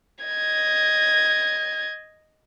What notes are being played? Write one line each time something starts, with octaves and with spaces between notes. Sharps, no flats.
D#5 G#6